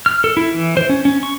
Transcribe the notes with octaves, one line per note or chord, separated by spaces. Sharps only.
F6
A4
E4
E3
C5
C#4
C#4
C#6